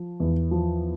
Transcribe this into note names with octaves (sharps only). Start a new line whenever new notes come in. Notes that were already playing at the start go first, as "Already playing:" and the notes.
Already playing: F3
E2
F3